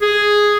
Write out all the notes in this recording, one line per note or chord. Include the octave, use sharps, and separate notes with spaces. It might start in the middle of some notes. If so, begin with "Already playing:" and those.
G#4